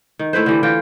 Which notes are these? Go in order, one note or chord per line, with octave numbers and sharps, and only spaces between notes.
D#3
A3 E4 B4 C5
D3 E3 G3
E3 F4 G5